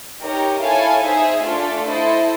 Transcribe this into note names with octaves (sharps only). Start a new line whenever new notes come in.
D#4 G4 A#4 C#5
E4 A4 C#5 F5 G#5
D#4 G#4 C5 E5 G#5
A3 D4 F4 A4
E4 A4 C5 D#5